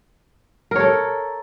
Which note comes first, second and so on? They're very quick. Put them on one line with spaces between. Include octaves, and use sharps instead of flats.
A#4 C#5 A4